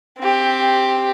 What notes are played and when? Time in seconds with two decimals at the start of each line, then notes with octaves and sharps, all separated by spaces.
0.19 C4 G4